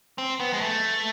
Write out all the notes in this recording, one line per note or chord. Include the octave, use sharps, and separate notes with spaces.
C4
B3
G#3
A3